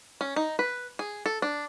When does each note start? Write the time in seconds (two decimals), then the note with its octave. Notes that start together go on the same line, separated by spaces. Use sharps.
0.21 C#4
0.36 D#4
0.59 B4
0.99 G#4
1.26 A4
1.42 D4